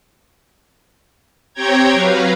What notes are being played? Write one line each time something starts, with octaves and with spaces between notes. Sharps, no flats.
C4 G4 C#5 G5 A#5 G#6
F#3 B4 F5 A#5